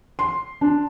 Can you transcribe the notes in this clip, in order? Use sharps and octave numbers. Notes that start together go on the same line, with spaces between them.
C6
D4